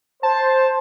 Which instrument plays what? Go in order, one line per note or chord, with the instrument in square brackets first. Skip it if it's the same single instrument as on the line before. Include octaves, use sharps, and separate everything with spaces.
[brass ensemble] C5 [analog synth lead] A5